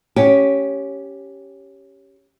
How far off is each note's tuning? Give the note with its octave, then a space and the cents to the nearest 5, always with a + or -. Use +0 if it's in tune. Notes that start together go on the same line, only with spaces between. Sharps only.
C#4 +0 G4 +0